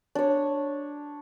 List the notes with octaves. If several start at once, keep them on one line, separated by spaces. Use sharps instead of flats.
D4 C#5